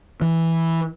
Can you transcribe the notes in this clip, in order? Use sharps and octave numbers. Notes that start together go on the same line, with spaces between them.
E3